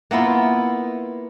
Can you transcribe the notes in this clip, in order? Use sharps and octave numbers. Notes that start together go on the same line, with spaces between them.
A#3 B3 E4 F4